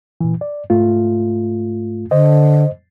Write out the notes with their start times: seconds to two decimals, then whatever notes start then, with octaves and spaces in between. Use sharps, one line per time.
0.21 A#2 E3
0.41 D5
0.70 G#2 A3 F4
2.11 D3 C5 D#5